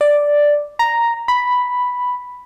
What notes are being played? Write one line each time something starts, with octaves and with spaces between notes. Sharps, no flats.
D5
A#5
B5